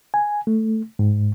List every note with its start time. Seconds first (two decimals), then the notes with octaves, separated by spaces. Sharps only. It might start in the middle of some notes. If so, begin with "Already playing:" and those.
0.14 G#5
0.47 A3
0.99 G#2